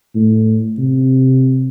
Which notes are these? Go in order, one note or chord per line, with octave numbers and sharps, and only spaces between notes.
A2
C3